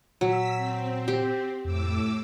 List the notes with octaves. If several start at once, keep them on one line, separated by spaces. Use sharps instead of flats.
A#2 F#3 E6 B6
C4
G4
F2 A2 D6 E6